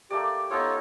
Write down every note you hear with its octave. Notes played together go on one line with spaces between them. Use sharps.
A3 A#3 G4 D5
B3 D#4 F4 A4 C#5